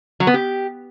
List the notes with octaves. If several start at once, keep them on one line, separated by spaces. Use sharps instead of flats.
F#3
B3
G4